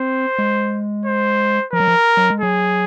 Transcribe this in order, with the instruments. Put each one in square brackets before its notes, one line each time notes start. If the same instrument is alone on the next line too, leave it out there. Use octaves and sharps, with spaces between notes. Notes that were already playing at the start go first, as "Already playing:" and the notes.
Already playing: [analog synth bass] C4 [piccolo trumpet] C5
[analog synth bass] G#3
[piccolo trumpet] C5
[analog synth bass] F3 [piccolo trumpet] A#4
[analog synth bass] F#3
F3
F#3
G#3
[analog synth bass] F#3 [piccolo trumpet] G#4